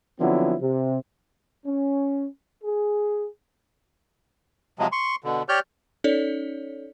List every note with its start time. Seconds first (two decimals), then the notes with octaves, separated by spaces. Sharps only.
0.20 D3 F3 F#3 B3 C4 E4
0.61 C3
1.66 C#4
2.64 G#4
4.79 C3 F3 F#3 G#3
4.92 C6 C#6
5.24 B2 D3
5.49 G4 C#5 D5 F6 G6
6.04 C#4 D#4 A4 C#5 D5